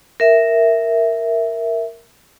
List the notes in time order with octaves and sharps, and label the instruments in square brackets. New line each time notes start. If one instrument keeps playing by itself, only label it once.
[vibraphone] A#4 E5